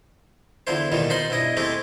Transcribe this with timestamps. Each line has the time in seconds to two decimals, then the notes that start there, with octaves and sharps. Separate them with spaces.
0.67 E2 D3 F3 E4 C5
0.92 A1 D#2 B2 D#3 F3 G3
1.10 D#4 F4 C5 B5 C6
1.30 B1 G2 E4 D#5 D#6
1.57 G#3 A3 C4 E4 G4